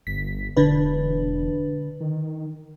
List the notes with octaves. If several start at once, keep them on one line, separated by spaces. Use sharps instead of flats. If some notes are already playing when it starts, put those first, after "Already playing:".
G1 B6
E1 D3 D4 B4
D#3